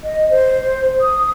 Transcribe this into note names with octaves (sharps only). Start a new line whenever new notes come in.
D#5
C5
D#6